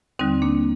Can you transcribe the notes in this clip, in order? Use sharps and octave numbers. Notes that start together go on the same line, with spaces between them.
D#2 D3 G3 C4 D#4
A#3 D4